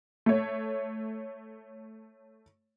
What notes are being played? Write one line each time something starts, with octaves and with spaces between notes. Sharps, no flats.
A3 C#5